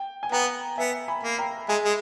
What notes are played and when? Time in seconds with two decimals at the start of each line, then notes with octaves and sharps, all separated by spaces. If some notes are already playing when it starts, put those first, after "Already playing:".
Already playing: G5
0.23 G#5
0.32 B3 G5 A#5
0.78 B3 E5 G#5
1.08 G#5 B5
1.23 A#3
1.39 G5 A#5
1.69 G#3 E5 G#5
1.85 G#3